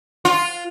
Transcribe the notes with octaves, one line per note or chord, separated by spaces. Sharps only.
F4